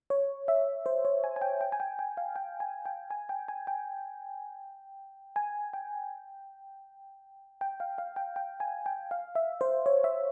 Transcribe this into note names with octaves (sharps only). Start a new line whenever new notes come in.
C#5
E5
C5
C#5
G#5
G#5
G5
G5
G#5
G5
G5
F5
G5
G#5
G5
G#5
G5
G#5
G5
G#5
G5
G5
F5
F5
G5
G5
G#5
G5
F5
E5
C5
C#5
E5